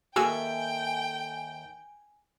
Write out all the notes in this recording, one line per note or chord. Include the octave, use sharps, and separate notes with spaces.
D#2 F#4 G#4 A4 E5 G5 G#5 E6